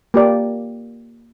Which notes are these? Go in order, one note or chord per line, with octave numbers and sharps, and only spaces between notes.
A#3 G4 D5